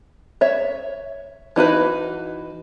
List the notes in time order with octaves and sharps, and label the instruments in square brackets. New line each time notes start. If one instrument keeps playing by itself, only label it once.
[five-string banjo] C#5 E5
E3 D#4 F#4 B4